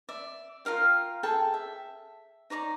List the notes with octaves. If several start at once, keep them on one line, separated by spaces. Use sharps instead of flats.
D5 E5
F4 A#4 F5 G5
G#4 A4 G5 A5
E5
D#4 C#5 D5 A#5